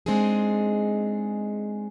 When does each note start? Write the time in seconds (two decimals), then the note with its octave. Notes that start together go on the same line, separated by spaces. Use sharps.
0.06 G#3 C4 D4 D#4 G#4